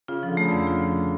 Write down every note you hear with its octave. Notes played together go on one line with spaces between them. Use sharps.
C#3 F4
F3
D3
C#3 A3
F2 D3
F4
F3
A3